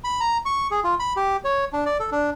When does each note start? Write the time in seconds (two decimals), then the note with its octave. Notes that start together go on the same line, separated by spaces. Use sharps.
0.04 B5
0.20 A#5
0.45 C#6
0.71 G#4
0.84 F4
1.00 B5
1.16 G4
1.44 C#5
1.73 D4
1.86 D5
2.00 A4
2.12 D4